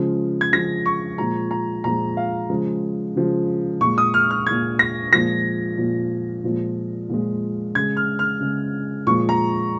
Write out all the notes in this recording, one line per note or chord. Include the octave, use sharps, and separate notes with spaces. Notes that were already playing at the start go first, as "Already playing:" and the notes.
Already playing: C#3 F3 G#3
G#6
C#3 F3 G#3 A#6
C#6
A#2 F3 G#3 A#5
A#5
A#2 F3 G#3 A#5
F5
C#3 F3 G#3
C#3 F3 G#3
A#2 G#3 C#6
D#6
F6
F6
A#2 G#3 G#6
A#6
A#2 F3 G#3 A#6
A#2 F3 G#3
A#2 F3 G#3
A#2 F3 G#3
C#3 G#3 G#6
F6
F6
C#3 G#3
A#2 F3 G#3 C#6
A#5